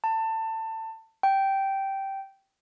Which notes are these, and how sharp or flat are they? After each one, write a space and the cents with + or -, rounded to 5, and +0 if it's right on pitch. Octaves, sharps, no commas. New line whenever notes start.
A5 +20
G5 -10